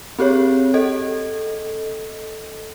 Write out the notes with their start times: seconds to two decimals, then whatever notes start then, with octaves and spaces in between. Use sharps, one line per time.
0.19 C4 G4 G#4 C#5
0.74 A4 D#5